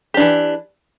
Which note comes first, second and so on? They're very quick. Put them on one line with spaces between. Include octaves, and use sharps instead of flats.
G4 D4 E3